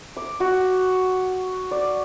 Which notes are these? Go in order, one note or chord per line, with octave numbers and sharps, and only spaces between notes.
D6
F#4
D5